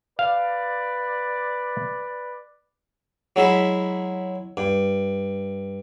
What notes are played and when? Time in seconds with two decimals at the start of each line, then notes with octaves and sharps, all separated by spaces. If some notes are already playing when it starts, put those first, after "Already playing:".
0.19 B4 D5 F5
3.36 F#3 G#3 E4 E5 B5
4.57 G2